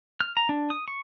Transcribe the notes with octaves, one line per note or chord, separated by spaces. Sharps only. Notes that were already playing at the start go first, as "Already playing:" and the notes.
F6
A#5
D4
D#6
C#6